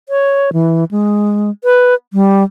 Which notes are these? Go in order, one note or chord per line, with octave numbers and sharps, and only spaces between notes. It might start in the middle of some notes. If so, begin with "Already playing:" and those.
C#5
E3
G#3
B4
G3